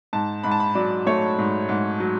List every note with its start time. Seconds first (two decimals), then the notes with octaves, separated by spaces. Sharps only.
0.13 G#2 A5
0.43 G#2 B5
0.51 A5
0.60 B5
0.75 F#3 D5
1.06 A3 C#5
1.39 G#2
1.69 G#2
2.00 F#3